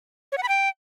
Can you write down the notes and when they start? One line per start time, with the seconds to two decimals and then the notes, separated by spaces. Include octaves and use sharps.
0.32 C#5
0.38 F#5
0.43 B5
0.48 G5